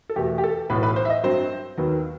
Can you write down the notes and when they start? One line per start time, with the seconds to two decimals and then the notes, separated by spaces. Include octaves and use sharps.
0.09 A4
0.16 E2 B2 A3 G4
0.38 G4
0.44 A4
0.69 B1 A2 E3 B3 B4
0.83 B4
0.96 C5
1.05 E5
1.10 D#5
1.23 G2 F#3 C4 C5
1.78 D#2 D#3 F#3 B3